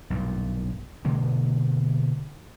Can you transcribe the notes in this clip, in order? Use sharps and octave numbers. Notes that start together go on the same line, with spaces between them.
B1 G2 A#2
B2 D3 G#3 A#3